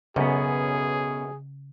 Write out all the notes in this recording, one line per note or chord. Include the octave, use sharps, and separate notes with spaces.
B1 F#2 C#3 B3 C#4 G#4